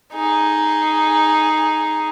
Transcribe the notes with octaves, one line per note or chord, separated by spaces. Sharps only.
D#4 G#4